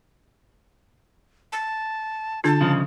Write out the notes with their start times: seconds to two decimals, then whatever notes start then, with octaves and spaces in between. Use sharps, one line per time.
1.52 A5
2.44 D3 D4 F4 A5
2.61 C#3 F3